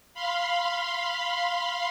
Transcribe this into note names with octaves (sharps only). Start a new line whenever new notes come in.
F5 B5 C6